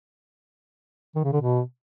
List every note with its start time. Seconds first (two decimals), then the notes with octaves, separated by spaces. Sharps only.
1.16 D#3
1.24 C#3
1.33 D3
1.41 B2